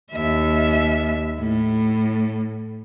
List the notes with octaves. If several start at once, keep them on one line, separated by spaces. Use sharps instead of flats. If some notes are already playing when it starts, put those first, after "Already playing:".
D#2 E5
A2